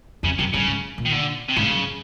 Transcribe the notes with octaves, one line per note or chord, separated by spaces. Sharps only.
F2 C#3
F#2 C3
G2 C#3
G#2
A#2
D#3
D3
C3
G#2 C#3
F#2